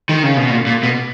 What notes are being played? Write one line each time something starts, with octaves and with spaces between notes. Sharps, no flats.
D#3
C#3
B2
A#2
A#2
B2